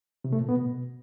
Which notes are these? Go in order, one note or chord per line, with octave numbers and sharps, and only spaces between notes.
C3
A3
A#2
B3
B2